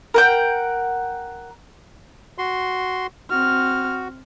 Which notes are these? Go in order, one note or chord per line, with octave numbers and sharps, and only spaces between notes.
A#4 F#5 G5
F#4 C6
C4 F#4 F6